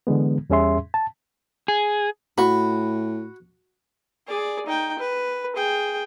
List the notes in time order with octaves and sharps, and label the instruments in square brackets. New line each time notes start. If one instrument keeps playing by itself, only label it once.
[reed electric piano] D3 E3 G#3 B3
E2 G3 C#4 G#4 E5 C6
A5
[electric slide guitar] G#4
[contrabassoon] A2 [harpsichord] F#4 [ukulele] B5
[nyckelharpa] G#4 D5
D#4 G5
B4
G#4 G5